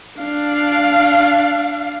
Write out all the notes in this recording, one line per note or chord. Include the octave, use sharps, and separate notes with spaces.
D4 F5